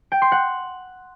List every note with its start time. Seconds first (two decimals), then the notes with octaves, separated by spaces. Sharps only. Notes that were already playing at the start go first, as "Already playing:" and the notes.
0.12 G5
0.22 C6
0.32 F#5